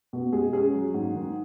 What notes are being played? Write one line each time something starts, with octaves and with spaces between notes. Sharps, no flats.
B2
G#3 G#4
C#4 G#4
F#3
G#2
D#3